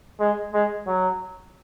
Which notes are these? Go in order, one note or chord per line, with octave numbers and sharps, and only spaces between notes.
G#3
G#3
F#3